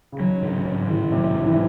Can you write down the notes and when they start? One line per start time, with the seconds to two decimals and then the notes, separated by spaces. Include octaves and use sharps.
0.12 C#3
0.19 D#3 F#3
0.42 G#2 C#3
0.65 G#2
0.88 A2 D#3
1.12 C3 F#3
1.35 G#2
1.46 E3